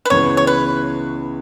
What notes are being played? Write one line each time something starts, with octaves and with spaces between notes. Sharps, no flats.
B4
C#2 C#3 E3 B3 C#5
C#5
B4